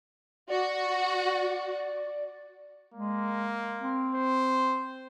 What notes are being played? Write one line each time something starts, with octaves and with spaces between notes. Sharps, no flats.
F#4 D5
G#3 A#3
C4
C5